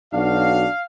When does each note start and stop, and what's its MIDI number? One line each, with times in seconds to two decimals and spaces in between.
0.14 0.66 35
0.14 0.71 62
0.14 0.64 66
0.14 0.83 77